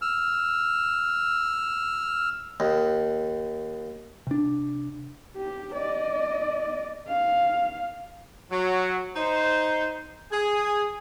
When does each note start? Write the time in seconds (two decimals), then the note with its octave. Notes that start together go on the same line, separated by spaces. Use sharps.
0.02 E6 F6
2.60 D#2
4.27 C3 D4
5.36 G4
5.74 D5 D#5
7.08 F5
8.52 F#3
9.16 D#4 C5
10.32 G#4